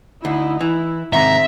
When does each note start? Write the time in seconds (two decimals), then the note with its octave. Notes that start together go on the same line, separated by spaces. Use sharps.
0.25 D2 D#4 E4
0.61 E3 E4
1.13 G#2 C3 D#3 C4 G#4 E5 A#5